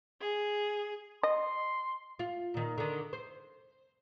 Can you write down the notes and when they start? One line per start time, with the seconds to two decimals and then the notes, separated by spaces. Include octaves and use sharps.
0.19 G#4
1.23 D#5 C6
2.19 F4
2.54 A#2 D#3
2.78 D3 D#3
3.13 C5